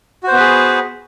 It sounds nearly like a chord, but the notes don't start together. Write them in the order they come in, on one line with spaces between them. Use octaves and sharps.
F#4 C5 B3 B4 G#4